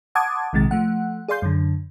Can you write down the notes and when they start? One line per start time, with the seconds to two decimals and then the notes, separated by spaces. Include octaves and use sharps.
0.15 F#5 A5 C6 D6 D#6 G#6
0.53 A#1 C3 D#3 G#3 A6
0.71 F3 A3 F#5
1.28 G#4 D5 F5 C6 G6
1.42 F#2 D3